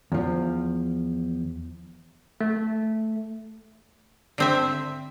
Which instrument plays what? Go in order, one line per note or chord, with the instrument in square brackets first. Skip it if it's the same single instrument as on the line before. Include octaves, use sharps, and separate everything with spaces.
[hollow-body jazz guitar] E2 F3
[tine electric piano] A3
[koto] D3 C4 E5